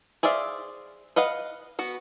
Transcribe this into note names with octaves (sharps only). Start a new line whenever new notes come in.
G#4 C5 D5 E5 F5
B4 D#5 F5 F#5
B3 F#4